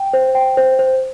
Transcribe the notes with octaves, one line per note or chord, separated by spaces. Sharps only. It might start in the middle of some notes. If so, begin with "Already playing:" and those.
Already playing: G5
C5
G5
C5
C5